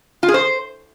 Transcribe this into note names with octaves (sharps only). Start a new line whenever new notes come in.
F4
G#4
C5